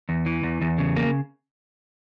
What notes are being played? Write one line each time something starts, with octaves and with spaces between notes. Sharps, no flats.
E2
E3
E2
E2
C#3
A#3